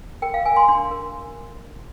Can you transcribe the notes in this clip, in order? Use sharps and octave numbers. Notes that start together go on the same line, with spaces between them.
A#4 G5
F5
A#4 G#5
C6
D4 C6
A#4